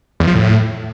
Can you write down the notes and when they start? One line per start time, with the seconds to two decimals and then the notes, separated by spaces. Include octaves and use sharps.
0.20 E2
0.27 F3
0.35 A2